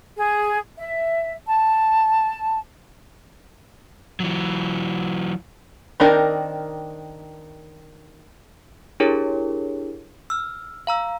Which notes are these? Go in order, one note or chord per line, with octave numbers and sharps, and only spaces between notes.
G#4
E5
A5
E3 F#3
D#3 C4 D4 D#4 A#4
D4 E4 G4 G#4 A#4 C#5
E6 F6
F5 A#5 E6